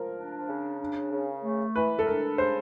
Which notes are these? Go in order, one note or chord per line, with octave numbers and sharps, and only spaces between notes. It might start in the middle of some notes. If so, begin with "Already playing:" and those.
Already playing: F3 A#4
D4
C#3
D4
C#3
A3
E3 B4
A4
D4 A#4
C#3 C5